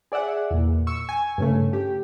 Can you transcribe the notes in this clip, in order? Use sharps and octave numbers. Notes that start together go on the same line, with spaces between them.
G#4 D5 E5 F#5
E2 A#2
C#6 E6
G#5
G2 C#3 A3
G4